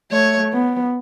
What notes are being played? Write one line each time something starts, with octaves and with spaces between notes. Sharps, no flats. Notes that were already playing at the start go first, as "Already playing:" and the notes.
A3 C#5
B3